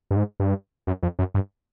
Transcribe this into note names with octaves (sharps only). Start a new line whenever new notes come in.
G2
G#2
G2
F#2
F2
F#2
G2